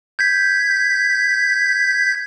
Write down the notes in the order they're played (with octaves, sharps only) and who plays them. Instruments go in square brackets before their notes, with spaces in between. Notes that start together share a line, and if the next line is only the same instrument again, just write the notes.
[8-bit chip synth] G6 G#6 B6